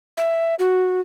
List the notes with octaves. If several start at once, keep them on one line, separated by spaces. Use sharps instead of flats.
E5
F#4